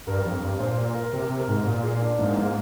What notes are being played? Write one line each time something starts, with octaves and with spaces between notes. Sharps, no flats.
G2 A#4
F2
G2
A#2 C5
A#4
A#4
C3 A#4
C3
A#4
G#2
A#2
G#4
D4
G#2 A#3
A#3